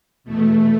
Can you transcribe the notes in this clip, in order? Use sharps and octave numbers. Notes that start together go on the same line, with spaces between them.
E2 B2 A3